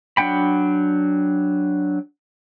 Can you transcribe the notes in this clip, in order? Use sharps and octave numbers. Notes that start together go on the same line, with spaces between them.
F#3 D4 F#5 G5 B5